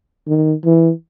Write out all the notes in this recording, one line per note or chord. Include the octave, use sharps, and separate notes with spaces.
D#3
E3